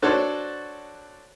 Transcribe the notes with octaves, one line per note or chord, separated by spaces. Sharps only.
D4 F#4 A4 C5 C#5